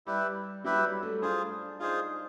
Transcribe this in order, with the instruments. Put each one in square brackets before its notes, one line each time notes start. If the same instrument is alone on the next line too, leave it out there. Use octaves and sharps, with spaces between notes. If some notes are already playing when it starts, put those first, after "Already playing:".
[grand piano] G3 [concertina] E4 G4 B4 E5
[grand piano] F#3 [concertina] E4 G4 B4 E5
[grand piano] G3
A3
[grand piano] D4 [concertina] F4 G#4 C5
[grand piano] D#4 [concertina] F4 G#4 C5